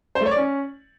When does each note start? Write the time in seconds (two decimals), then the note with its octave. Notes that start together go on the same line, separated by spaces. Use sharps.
0.15 C5
0.21 A3
0.26 C#5
0.31 D5
0.36 C#4